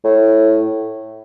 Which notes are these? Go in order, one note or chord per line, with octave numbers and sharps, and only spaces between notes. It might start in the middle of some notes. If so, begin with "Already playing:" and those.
A2